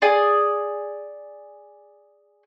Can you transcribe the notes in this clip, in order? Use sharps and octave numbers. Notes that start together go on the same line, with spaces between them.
G#4 D5 G#5 D#6